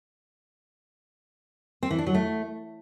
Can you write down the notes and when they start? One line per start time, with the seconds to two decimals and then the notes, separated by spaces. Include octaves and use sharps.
1.83 C4
1.91 E3
1.99 D4
2.07 F#3
2.15 A3